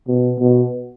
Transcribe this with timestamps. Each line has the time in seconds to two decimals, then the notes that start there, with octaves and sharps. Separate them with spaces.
0.08 B2
0.40 B2